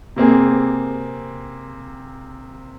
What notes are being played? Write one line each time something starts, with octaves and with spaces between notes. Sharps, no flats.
C3 A#3 C4 G#4